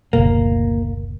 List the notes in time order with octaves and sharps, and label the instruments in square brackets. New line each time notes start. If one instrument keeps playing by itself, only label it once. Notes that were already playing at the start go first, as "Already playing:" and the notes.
[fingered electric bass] F#1 D2 B2 [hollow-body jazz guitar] A#3